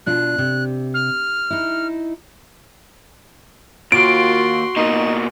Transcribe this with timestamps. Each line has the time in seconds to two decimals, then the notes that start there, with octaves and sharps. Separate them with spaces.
0.06 B2 D4 F4 F#6
0.38 C3
0.94 F6
1.50 D#4 E4
3.92 D#2 F4 F#4 C6 D7
4.77 B2 A#3 D#4